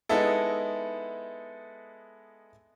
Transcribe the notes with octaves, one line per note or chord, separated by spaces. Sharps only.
G#3 B3 D#4 E4 A4